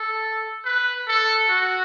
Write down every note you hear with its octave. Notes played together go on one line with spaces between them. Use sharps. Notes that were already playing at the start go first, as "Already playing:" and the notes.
Already playing: A4
B4
A4
F#4